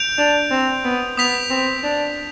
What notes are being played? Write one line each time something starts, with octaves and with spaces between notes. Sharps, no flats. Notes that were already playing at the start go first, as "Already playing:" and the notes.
Already playing: G6 D7 F7
D4
C4
B3
B3 D#6 B6 F7
C4
D4